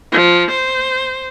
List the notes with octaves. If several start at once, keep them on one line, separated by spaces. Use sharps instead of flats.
F3
C5